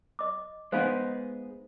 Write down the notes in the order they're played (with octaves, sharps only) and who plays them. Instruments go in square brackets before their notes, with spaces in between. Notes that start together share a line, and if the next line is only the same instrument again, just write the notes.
[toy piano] D#5 D6
[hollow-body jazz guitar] G#3 B3 D#4 [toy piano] C5 F5 G#5